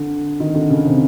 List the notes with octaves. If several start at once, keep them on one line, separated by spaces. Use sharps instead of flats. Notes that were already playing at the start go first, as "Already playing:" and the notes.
Already playing: D3
D#3
D3
C#3
C3